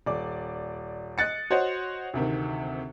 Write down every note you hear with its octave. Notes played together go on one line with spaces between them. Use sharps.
D#1 D5 D6
D#5 F#6 A6 C#7
F#4 C5 C#5 D#5 F#5
D2 C3 D#3